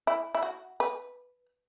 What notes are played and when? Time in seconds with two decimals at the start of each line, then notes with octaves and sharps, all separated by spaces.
0.07 E4
0.35 E4
0.43 F#4
0.80 B4